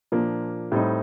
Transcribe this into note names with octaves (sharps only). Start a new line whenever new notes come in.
A#2 F3 A#3 D4
A2 G3 C4 D#4